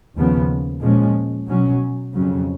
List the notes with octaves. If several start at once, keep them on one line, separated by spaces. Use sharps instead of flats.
D#2 C#3 F3 B3
A#2 F3 G#3 C#4
B2 F#3 C#4
F2 C#3 F#3 C#4